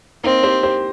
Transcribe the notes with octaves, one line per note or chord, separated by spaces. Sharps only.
A#3 C4 D#4
G4 C5
G4 C5